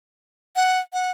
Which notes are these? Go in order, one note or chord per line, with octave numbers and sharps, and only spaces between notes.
F#5
F#5